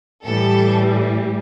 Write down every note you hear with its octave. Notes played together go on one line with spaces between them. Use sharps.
A2 E3 G3 A4